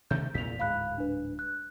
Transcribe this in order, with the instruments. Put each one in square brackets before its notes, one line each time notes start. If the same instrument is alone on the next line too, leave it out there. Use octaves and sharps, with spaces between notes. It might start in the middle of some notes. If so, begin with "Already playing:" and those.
[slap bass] C3 D#3 A3 [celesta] G6
[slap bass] E2 A#2 [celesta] B6 F7
[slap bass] D1 G#2 [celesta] F5 B5 F#6
[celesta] D4 B4
F#6